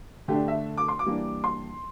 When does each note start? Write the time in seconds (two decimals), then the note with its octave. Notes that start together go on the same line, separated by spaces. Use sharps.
0.28 D3 A3 D4 G4
0.48 E5
0.78 D6
0.88 C6
0.99 D6
1.06 E3 G3 A#3 D4
1.44 C6